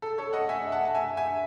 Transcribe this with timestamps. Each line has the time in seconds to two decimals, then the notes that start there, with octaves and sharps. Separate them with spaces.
0.02 A4
0.18 A4 C#5
0.33 D#5 F#5
0.49 E5 G#5
0.72 F#5 A5
0.85 A5
0.95 E5 G#5
1.17 E5 G#5